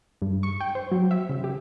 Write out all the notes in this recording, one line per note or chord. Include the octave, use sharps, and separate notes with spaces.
G2
C#6
G5
C5
F#3
E5
C#3
G4